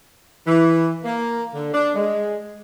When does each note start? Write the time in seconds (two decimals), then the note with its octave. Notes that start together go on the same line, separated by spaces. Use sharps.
0.47 E3
1.04 A#3
1.54 D3
1.74 D4
1.96 G#3